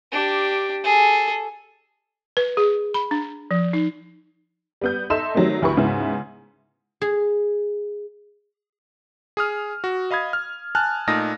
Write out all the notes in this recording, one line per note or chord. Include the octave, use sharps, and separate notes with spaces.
D4 G4
G#4 A4
B4
G#4
B5
D4
F3
D#4
G3 B3 G6
D#4 A4 E5 C6 E6 E7
D#3 F#3 G3 A3 C4
D2 E4 G4 B4 B5 C#6
G#2 C#3 B3 E4
G#4
G#4 D#6 F6
F#4
D#5 F5 B5 D#6 G#6
F6
G#5 A5 F6 F#6
A#2 A3 D#4 A5 D#6 A#6